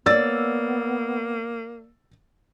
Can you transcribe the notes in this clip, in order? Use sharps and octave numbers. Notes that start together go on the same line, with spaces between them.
A#3 B3 C#5 D5 E6 A6